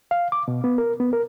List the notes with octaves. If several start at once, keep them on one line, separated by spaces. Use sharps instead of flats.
F5
D6
B2
B3
A#4
B3
A#4